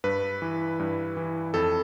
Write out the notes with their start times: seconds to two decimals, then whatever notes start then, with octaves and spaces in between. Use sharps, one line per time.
0.04 G2 B4
0.42 E3
0.79 G2
1.17 E3
1.54 F2 A4